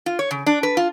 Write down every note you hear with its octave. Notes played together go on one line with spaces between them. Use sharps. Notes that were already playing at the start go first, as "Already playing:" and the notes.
F4
C#5
C#3
D4
B4
F4